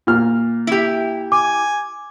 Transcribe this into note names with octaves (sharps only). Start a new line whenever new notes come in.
A#2 F6
E4 G4
G#5 D6